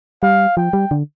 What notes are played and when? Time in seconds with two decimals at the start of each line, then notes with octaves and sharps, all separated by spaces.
0.23 G3 F5
0.57 F3 G5
0.73 G3
0.91 D3